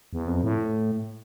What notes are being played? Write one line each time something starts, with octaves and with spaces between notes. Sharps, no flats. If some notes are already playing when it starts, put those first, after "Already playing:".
E2
F2
A2